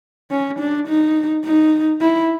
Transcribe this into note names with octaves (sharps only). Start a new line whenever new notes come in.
C#4
D4
D#4
D#4
E4